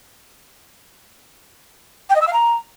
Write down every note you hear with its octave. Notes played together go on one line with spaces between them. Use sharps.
G5
D#5
E6
F5
A#5